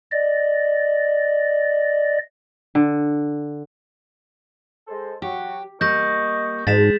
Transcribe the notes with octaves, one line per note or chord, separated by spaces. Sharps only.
D5 D#5
D3
G#3 A4 C5
F#3 F#4 G4
G3 A#3 D#5 C#6 G6 A#6
D2 G#2 G#3 A6 B6 E7